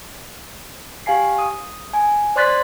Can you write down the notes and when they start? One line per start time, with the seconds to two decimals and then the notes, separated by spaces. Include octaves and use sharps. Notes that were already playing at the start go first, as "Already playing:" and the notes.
1.06 G4 F5 G#5 C7
1.38 D#6
1.93 G#5
2.36 C5 D5 C6 F#6 A6 B6